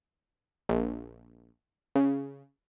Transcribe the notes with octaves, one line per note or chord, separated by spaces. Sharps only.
A#1
C#3